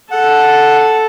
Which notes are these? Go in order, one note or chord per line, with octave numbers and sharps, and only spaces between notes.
A4 F#5